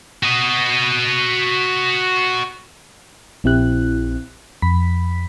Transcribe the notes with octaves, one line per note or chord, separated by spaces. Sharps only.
F#4 D#5
A#1 C4 E4 G4 F#6
F2 B5 B6